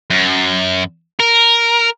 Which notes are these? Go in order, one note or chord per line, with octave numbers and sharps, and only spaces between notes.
F#2
A#4